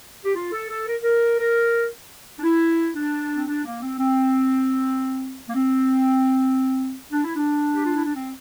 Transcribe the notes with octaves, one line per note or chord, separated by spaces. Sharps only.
G4
F4
A4
A4
A#4
A#4
A#4
D4
E4
D4
C4
D4
A#3
C4
C4
A#3
C4
D4
E4
D4
G4
F4
E4
D4
C4